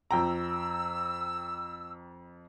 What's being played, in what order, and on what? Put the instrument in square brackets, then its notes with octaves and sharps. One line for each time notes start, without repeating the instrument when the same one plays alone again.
[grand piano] F2 G5 A#5 [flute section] E6